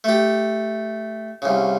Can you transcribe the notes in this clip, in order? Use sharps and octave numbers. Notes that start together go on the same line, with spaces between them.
A3 G4
C2 C#3